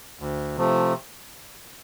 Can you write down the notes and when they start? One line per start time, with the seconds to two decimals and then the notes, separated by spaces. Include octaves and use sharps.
0.19 D2
0.56 C3 F3 A3